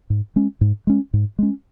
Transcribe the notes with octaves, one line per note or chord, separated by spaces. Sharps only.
G#2
G#3 C#4
G#2
G#3 C#4
G#2
G#3 C#4